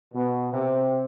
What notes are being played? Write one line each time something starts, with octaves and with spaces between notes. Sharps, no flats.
B2
C3